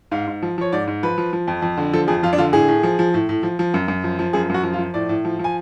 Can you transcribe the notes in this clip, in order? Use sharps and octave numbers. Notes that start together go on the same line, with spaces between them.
G#2 F5
G#2
F3
F3 C#5
G#2 D5
G#2
F3 B4
F3
F3
F2
F2
D3
F3 A4
F2 G#4
F2 F4
D4
D3 F4
A2 G#4
A2
F3
F3
A2
A2
F3
F3
F#2
F#2
F3
F3
F#2 G#4
F#2 F#4
F3
F4
F3
A2 D5
A2
F3
F3 G#5